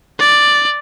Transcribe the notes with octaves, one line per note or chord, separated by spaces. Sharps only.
D5